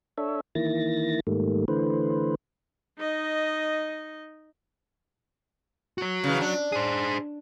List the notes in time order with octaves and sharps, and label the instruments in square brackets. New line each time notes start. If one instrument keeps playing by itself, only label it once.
[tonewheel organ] D4 A4 C#5 E5
D#3 E3 A#3 E4 A6 A#6
G#2 D#3 G3 A3 A#3
D3 E3 A3 B4 C5
[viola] D#4 D#5
[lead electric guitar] F#4 C#5
[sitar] C#3 E3
D4
[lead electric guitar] G#4 C5